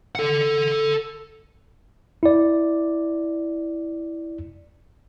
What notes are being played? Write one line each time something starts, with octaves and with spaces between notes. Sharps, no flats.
A4 F#5
E4 D5